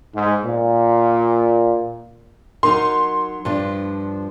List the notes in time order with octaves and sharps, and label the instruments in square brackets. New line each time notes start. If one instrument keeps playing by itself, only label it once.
[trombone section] G#2
A#2
[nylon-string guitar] F#3 D#4 A#4 [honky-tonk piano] C6
[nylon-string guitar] G2 F3 D4